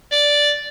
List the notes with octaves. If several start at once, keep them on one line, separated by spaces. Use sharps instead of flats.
D5